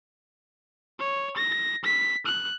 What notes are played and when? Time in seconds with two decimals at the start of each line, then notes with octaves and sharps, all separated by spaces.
0.99 C#5
1.37 A#6
1.84 B6
2.26 F#6